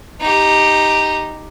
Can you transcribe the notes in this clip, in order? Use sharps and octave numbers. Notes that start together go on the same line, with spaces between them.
D#4 G4